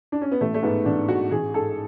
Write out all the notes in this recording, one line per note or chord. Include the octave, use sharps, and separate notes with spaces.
D4
C#4
B3
A1 A3
A3
G#2 B3
A1 D4
G#2 F#4
A1 G#4
G#2 A4